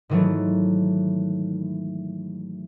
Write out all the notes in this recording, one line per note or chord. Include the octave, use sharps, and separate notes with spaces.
G#2 D#3 E3 F#3 A3